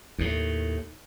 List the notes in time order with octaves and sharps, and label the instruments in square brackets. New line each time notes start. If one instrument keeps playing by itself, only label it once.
[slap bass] D#2 A2